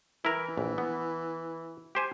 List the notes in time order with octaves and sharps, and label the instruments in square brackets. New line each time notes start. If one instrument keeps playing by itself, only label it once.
[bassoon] E3 [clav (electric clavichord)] E4 A#4
[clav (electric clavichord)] A#1
B3
G4 C5 G#5